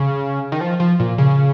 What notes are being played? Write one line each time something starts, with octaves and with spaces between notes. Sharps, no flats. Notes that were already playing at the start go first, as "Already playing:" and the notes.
Already playing: C#3
D#3
F3
F3
A#2
C#3